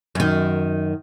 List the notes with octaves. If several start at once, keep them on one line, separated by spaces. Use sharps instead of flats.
F#2 D#3